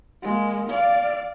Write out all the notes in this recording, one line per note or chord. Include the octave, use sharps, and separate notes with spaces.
G#3 A#3
D5 F5